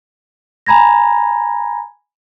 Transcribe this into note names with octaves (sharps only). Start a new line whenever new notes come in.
G#5 A#5 B5 G#6 A#6